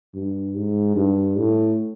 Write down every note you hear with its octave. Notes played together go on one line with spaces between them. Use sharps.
G2
G#2
G2
A2